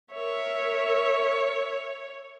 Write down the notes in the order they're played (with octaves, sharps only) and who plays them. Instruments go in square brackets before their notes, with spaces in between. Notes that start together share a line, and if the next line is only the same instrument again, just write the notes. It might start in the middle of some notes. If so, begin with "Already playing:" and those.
[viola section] A#4 E5 [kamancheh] C#5